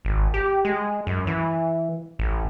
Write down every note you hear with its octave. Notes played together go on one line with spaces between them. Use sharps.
G#1
G4
G#3
F#2
E3
A1